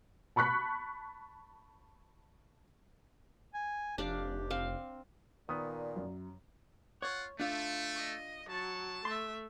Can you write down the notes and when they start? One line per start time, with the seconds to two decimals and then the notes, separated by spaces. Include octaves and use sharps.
0.36 A5 B5 C#6 F#6 B6
3.54 G#5
3.98 F1 D4 G4 D5 F5
4.50 C4 F5
5.49 A#2 D#3 A#3 B3 D5 D#6
5.96 F#2
7.02 F4 C#5 F#5
7.40 A3 D4 F4
7.96 D#5
8.50 F#3 A5
9.05 A3 E5 C6